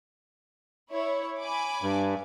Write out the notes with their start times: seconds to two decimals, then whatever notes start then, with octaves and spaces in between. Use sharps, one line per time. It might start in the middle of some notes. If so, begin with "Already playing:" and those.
0.90 E4 C#5
1.39 G#5 B5 D6
1.82 G2